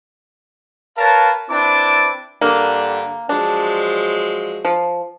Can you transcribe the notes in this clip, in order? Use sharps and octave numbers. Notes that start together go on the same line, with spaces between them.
A#4 B4 C#5 F5 A5
C4 D4 E4 B4 A5 D6
G2 D3 A#3 D4
F3 F#3 G#3 D4
F3